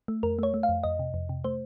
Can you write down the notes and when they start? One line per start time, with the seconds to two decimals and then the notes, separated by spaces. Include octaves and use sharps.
0.08 A3
0.23 F2 A#4
0.39 A3 C#5
0.54 A3
0.63 F5
0.69 F2
0.83 F2 D#5
0.99 C3
1.14 F2
1.29 C3
1.44 A3 C5